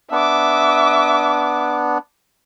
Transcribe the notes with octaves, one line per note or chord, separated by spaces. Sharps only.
B3 D4 E5 D6